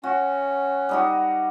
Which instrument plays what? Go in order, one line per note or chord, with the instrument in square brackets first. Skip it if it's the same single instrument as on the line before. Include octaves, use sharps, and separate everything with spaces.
[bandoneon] C#4 [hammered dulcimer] F#4
[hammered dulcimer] G3 D#4 F#4